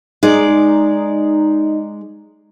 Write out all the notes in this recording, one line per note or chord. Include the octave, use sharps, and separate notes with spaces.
G#3 D#4 D5